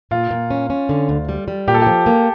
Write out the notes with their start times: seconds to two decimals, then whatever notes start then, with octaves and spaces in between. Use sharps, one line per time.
0.11 A#2 F4
0.31 A#2
0.50 C#4
0.70 C#4
0.89 D3
1.09 D2
1.29 G3
1.48 G3
1.68 A#2 G4
1.74 A4
1.82 F3 G4
2.06 A#3